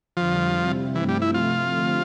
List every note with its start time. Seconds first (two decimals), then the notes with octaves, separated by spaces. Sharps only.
0.17 F2 D3 F3 G3
0.56 C3 G3 C4 E4
0.95 G2 E3 F3 A3 C4 E4
1.09 G3
1.22 E4
1.34 C3 F3 A3 F4
1.73 D3 F3 A3 C4 G4